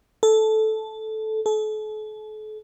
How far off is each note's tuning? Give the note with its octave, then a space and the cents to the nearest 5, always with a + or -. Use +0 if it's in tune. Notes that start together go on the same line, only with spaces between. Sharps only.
A4 -10
A4 -40